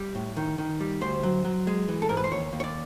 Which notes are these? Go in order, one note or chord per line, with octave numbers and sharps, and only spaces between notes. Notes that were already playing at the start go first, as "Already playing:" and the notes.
Already playing: G3
A2
D#3
D#3
G3
D2 C5
F#3
F#3
G#3
E3
A4
G#2 A#4
B4
C5
D#2 C#5
D#2
C#5
D5